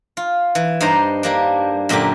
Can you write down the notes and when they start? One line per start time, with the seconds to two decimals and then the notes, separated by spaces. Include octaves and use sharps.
0.17 F4
0.55 E3
0.81 G2 D#4 C5 D5 A#5
1.23 G3 A#3 D4
1.89 F#2 A#2 D3 D4 G4